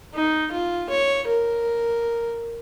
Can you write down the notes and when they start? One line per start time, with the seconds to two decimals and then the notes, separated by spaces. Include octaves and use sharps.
0.14 D#4
0.51 F4
0.90 C#5
1.27 A#4